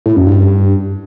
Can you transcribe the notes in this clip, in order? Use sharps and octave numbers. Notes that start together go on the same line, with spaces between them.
A2
F#2
G2
G2